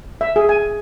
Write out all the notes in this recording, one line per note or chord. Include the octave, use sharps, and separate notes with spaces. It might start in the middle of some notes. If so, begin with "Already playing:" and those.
E5
G#4
G#5